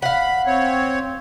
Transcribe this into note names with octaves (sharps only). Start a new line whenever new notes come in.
F5 F#5 B5
C4 C#5